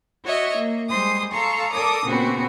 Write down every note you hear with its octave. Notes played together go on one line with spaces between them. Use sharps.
F#4 C#5 D#5 E5
A#3
G3 G#3 C5 C6 D#6
A4 F5 A5 A#5 C6 C#6
A4 A#4 D5 D6 D#6
A#2 C#3 B3 C4 F#4